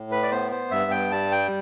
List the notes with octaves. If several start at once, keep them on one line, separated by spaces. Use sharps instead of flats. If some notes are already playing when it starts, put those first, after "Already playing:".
Already playing: A2
B4
D5
B3 C5
C5
G2 E5
G5
G3 A5
G5